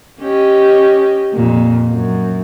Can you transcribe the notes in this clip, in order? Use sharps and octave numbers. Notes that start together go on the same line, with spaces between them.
C#4 G4 D#5
F2 A#2
F#2